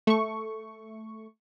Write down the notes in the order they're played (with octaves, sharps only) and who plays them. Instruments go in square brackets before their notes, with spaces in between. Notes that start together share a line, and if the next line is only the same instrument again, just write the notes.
[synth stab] A3 C#6